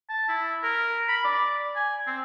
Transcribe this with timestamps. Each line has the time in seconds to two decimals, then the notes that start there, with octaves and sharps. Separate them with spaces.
0.09 A5
0.29 E4
0.63 A#4
1.08 B5
1.24 D5
1.76 G#5
2.07 C4